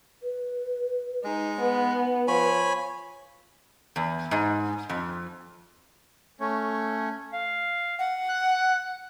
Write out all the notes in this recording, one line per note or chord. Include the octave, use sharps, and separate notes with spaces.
B4
G#3 D#4
B3 B4
F3 C#5 G#5 B5
E2
G#2
F2
A3 C#4 C#5
F5
F#5
F#6